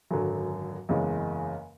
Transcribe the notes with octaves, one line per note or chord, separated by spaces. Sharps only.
G#1 F#2 D3 F#3
F#1 E2 C#3 E3 G#3